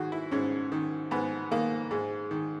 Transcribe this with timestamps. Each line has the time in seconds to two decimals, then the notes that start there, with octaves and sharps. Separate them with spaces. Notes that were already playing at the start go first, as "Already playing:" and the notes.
Already playing: G#2 D#3 F#4 G#4
0.12 E4
0.32 G#2 C#4
0.72 D#3
1.11 G#2 B3
1.51 D#3 A#3
1.91 G#2 G#3
2.31 D#3